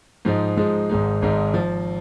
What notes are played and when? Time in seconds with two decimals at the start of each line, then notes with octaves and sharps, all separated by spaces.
0.25 G#2 F3 G#3 D#4
0.57 G#2 F3 G#3 D#4
0.90 G#1 G#2 G#3 D#4
1.22 G#1 G#2 G#3 D#4
1.54 F3